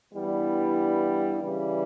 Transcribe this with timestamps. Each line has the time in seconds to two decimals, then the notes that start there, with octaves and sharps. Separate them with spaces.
0.12 G2 E3 G3 B3 E4
1.39 C#3 E3 G3